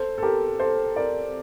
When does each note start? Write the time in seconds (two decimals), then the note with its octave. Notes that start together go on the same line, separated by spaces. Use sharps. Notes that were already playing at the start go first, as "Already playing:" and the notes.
Already playing: A4 C5
0.18 A4
0.23 G4 A#4
0.60 A4 C5
0.96 A#4 D5